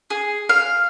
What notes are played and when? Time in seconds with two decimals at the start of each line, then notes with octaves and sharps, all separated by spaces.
0.10 G#4
0.49 F5